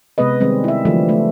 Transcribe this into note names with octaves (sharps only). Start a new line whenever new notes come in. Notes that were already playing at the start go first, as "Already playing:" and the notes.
C3 G#3 B3 B4 D#5
D#3 G3 G#3 C4
E4 E5
D3 E3 F3 G3 A3
A3